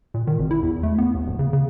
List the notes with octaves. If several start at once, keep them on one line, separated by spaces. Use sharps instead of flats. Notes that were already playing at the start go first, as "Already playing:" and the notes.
A#2
D#3
G#1
E4
E2
A3
B3
D#2
D1
C#3
C#3